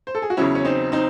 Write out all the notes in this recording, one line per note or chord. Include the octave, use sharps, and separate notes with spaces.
C5
A4
G#4
F#4
E2 C#3 F#3 C#4 E4
C#4
C4 D#4
C4 D#4